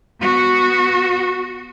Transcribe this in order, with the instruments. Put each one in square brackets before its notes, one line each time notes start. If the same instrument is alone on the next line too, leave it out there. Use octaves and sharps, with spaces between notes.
[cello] B3 F#4